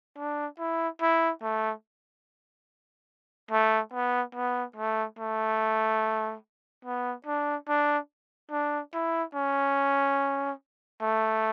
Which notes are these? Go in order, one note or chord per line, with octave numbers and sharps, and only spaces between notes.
D4
E4
E4
A3
A3
B3
B3
A3
A3
B3
D4
D4
D4
E4
C#4
A3